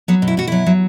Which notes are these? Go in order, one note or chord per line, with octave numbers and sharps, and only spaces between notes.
F#3 B3
B2
E4
B2 F#4
F#3 E4
F#3